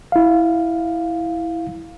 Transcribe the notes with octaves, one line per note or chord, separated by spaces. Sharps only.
E4 F5